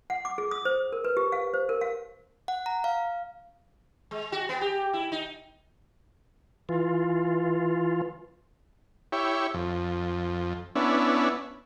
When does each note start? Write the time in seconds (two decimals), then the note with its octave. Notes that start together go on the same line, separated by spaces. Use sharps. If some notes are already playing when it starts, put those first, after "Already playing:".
0.10 F#5
0.25 D6
0.38 G#4
0.51 D#6
0.65 C5
0.92 A#4
1.04 B4
1.17 G4
1.32 F5
1.54 C5
1.69 A#4
1.81 F5
2.48 F#5
2.66 A#5
2.84 F5
4.11 G#3
4.32 F#4
4.49 B3
4.61 G4
4.93 E4
5.12 D#4
6.69 E3 F4
9.12 E4 G4 C#5
9.54 F2
10.75 B3 C#4 D4 E4